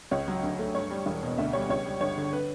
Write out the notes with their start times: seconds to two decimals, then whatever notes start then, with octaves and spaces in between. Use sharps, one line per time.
0.11 C#2 C#5
0.28 F#3
0.43 D2
0.59 A3
0.75 G2 C#5
0.90 G3
1.06 E1
1.23 B2
1.38 D2 E5
1.53 G3 C#5
1.70 C#2 C#5
1.86 G3
2.01 G1 C#5
2.17 D3
2.33 B4